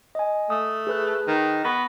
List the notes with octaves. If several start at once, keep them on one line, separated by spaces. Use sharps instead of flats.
D#5 G#5
A3 D#6
G#4 B4 F#6
D#3
B3 B5 C#6 A#6